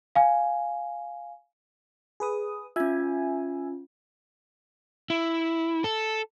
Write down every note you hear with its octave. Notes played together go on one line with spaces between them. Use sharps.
F5 G#5
G#4 B4 D#6
C#4 F4 E5 G#5
E4
A4